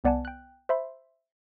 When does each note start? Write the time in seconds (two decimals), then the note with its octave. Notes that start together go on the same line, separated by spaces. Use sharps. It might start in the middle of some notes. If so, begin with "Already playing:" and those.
0.04 C2 B3 D5 F#5 G#5 A5
0.25 G5 F#6
0.69 C5 E5 B5 C6